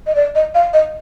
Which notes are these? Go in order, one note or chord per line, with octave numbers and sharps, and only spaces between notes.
D#5
D5
D#5
F5
D#5